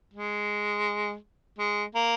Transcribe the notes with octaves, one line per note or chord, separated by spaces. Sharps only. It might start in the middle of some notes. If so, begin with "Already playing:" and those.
G#3
G#3
A#3